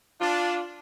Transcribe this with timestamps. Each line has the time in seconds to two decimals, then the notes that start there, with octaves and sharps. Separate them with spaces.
0.21 D4 F4